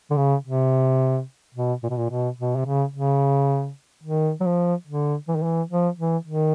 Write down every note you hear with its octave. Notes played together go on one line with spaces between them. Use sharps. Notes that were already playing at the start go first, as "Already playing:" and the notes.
D3
C#3
C3
B2
A#2
B2
A#2
B2
B2
C3
C#3
C#3
D#3
F#3
F3
D3
E3
D#3
E3
F3
E3
D#3